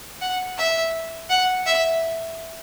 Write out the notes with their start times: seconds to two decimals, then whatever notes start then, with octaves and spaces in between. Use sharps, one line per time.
0.21 F#5
0.58 E5
1.30 F#5
1.66 E5